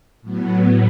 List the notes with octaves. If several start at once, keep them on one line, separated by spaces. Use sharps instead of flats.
A2 F#3 B3